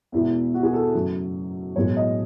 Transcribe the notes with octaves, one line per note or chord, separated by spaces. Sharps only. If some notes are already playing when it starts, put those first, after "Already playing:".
E2 B2 G#3 E4
F#4
G#4
A4
F#2 C#3 F#3 A3
B1 A2 G#3 C#5
D#5